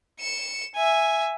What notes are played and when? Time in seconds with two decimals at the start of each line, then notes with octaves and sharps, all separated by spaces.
0.20 C#7 E7
0.75 E5 G#5